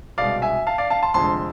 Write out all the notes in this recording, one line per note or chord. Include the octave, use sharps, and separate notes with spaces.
C2 B2 G#3 D5 F5
E5 G#5
F5 A5
D5 F5
F5 A5
A5 C6
F1 F2 D3 G#3 A5 C6